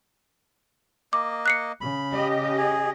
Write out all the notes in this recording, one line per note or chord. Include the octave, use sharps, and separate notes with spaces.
A#3 D#5 D6
F#6 C7 C#7
C#3 B5
G4 D#5
G#4